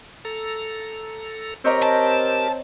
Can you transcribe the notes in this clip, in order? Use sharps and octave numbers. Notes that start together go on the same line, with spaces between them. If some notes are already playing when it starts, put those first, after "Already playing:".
A4 A#5
C4 G4 A#4 C#5 D#5 A#5
A5